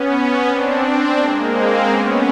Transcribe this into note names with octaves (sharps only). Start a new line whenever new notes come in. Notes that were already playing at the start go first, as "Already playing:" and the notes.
Already playing: B3 C#4
B3 C#4
C4 D4
C4 D4
G#3 A#3
A#3 C4
B3 C#4